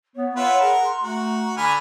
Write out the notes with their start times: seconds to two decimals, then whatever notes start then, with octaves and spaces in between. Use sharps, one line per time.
0.16 B3 C#5
0.36 F4 B4 E5 F#5
0.61 G#4 A#4
0.84 C6
1.04 A3 F#4 A#5
1.57 D3 G#5 B5 F6